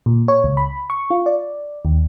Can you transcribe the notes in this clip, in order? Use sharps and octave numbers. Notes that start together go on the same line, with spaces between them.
A#2
C#5
C#2
B5
C#6
F4
D5
D#2